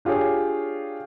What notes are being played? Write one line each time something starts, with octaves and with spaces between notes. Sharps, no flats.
D4 F4 G4 G#4 C#5